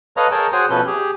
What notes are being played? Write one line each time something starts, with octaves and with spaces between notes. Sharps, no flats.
A4 B4 C#5 D#5 F5 A#5
G#4 A#4 C#5 G5 A5
F#4 G#4 C5 C#5 G5 D#6
B2 F3 C#4 A4 B4 G6
G4 G#4